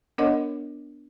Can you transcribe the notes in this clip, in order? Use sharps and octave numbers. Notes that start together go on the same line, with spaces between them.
B3 D4 A#4 C#5 D#5 F#5